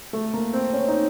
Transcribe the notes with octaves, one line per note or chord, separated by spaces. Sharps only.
A3
A#3
C4
C#4
D#4